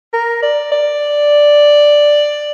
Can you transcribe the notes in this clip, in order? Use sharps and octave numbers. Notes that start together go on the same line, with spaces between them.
A#4
D5
D5